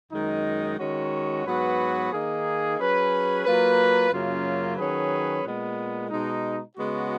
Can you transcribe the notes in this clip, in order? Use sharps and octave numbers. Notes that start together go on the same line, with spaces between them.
F#2 D#3 G#3 D#4
D#3 G#3 C#4 F#4
G#2 F#3 B3 F#4 B4
D#3 A#3 D#4 G#4
F#3 C#4 G#4 B4
F#3 A#3 F4 B4
F#2 C#3 F#3 A#3 F4
D#3 F#3 C#4 G#4 B4
A#2 G#3 B3
B2 G#3 D#4
C#3 G#3 B3 F#4